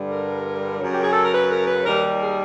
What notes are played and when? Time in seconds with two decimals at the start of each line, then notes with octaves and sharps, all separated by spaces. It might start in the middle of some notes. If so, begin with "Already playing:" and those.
Already playing: G2 D3 G3
0.10 A#4
0.80 F#2 C#3 F#3
0.92 G4
1.02 G#4
1.12 A4
1.22 A#4
1.32 B4
1.50 A#4
1.67 B4
1.84 D#2 D#3 G3 A#4
2.19 G#4